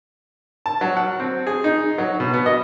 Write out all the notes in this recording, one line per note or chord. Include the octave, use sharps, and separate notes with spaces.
A5
F#3
F#5
C4
G#4
D#4
F#3
B2
B3
D#5